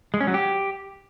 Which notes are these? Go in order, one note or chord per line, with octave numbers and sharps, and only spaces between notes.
G#3
C#4
F#3
G4